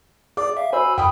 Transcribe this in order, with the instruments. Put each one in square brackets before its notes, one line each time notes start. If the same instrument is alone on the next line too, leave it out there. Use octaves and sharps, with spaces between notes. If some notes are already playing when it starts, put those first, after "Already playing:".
[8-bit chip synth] G#4 D5 [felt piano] D6
[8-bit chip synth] E5 F5
[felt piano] F#4 C5 [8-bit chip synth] G#5 B5 E6
[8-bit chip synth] F#2 [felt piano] G5 B5 D#6